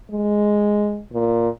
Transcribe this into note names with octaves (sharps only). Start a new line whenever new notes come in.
G#3
A#2